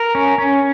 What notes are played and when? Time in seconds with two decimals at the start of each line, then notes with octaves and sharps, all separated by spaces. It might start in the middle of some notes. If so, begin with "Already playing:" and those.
Already playing: A#4
0.15 C#4
0.38 C#4